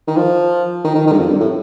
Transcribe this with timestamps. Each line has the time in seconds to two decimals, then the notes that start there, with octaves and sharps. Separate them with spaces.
0.08 D#3
0.16 F3
0.84 D#3
0.95 D#3
1.07 D#3
1.13 G2
1.18 F2
1.29 G2
1.40 A2